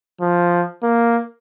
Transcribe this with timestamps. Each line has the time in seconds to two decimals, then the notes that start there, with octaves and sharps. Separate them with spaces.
0.21 F3
0.83 A#3